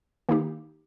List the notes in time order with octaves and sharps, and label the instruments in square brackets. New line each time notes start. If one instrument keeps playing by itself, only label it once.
[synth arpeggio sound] D#3 A#3 D#4 G4